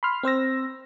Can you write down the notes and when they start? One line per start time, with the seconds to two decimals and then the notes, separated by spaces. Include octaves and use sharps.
0.03 B5 C6 F6
0.23 C4 C5 E6 A#6